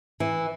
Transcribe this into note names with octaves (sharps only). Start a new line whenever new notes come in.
E3